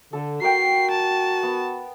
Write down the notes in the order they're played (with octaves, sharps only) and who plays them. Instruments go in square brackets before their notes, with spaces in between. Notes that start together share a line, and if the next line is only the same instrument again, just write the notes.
[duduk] D3 [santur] A4
[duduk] F#4 [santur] A#4 G5 [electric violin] C7
[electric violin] A5
[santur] B3